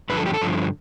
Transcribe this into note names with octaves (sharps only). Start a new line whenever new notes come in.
G2 D3 F3 B4
A4
G4
A4
G2 D3 F3